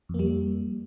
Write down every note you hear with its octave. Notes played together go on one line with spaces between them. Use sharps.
F2 G3 A#3